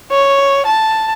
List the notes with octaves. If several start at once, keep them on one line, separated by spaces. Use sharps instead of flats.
C#5
A5